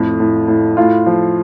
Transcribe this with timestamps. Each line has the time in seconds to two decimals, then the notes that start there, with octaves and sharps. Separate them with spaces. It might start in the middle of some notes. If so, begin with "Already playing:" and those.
Already playing: F2 A2
0.20 A2
0.48 A2
0.77 A2 F4
1.06 F3